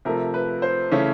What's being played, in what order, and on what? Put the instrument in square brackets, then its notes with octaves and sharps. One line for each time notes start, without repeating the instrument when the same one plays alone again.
[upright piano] C3 F3 A3 A#4
B4
C5
C#3 E3 A3 C#4 C#5